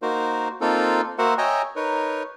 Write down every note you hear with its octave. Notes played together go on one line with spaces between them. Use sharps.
A#3 D#4 F#4 A#4 C5
A#3 C4 D#4 F4 A4
A#3 F#4 A#4 C5 E5 F#5
C#5 D#5 E5 G5 G#5 A#5
D#4 A#4 B4 C#5